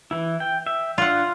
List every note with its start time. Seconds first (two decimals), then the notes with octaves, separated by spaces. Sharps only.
0.11 E3 E4
0.40 G5
0.67 E5
0.98 D4 F4 F5 F#5